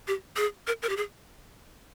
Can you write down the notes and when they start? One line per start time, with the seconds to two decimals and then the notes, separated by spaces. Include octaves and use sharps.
0.08 G4
0.37 G#4
0.67 A#4
0.82 A#4
0.89 G4
0.97 G#4